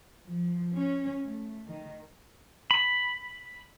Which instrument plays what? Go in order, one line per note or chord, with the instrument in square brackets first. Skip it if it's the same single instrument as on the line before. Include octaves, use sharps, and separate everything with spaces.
[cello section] F3
C#4
A3
D#3
[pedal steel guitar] B5